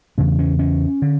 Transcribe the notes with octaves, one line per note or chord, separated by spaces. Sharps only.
E2 C#3 D4
C#4
C#4
D3